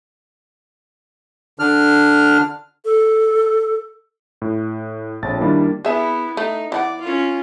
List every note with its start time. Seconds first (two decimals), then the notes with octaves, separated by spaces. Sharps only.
1.59 D3 D4 F6
2.85 A4
4.42 A2
5.22 A#1 F2 C#5 A5 A6
5.40 D#3 G3 A#3 D4 E4
5.85 B3 E4 G#4 E5
6.37 A3 D#4
6.72 E3 E4 D5 F#5
7.01 C#4 F4